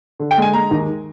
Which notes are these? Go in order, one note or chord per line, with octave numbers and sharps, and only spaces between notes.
D3
G5
G#3 G#5
G#3 A#5
D#2